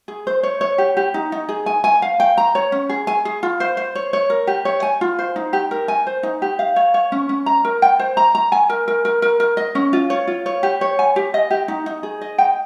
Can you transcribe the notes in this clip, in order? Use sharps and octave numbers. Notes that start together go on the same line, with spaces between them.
G#4
C5
C#5
C#5
G4
G4
D#4
D#4
G#4
G#5
G#5
F5
G5
A#5
C#5
C#4
G#4
G#5
G#4
F4
C5
C5
C#5
C#5
A#4
G4
C#5
G#5
F4
C5
D#4
G4
A#4
G#5
C5
D#4
G4
F5
C#5
C#5
C#4
C#4
A#5
A#4
G5
C5
A#5
A#5
G#5
A#4
A#4
A#4
A#4
A#4
D#5
C#4
F4
C#5
F4
C#5
G4
C#5
G#5
G4
D#5
G4
D#4
D#4
G#4
D#5
G5